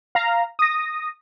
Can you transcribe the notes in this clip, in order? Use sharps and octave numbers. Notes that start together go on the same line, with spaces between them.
F5 A#5
D#6 A#6